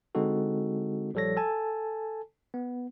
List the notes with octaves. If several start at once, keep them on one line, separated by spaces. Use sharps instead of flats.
D3 G#3 C4 D#4 F#4 A4
A#1 F3 G3 A4 C#5 A#6
A4 G#5 A5
B3